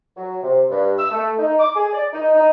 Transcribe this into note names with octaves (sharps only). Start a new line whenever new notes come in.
F#3
C3
G2
E6
A3
D#4
D6
G#4
D5
D#4
D#4